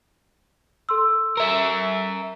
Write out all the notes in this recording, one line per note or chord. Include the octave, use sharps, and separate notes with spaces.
A4 C6 E6
A#4 E5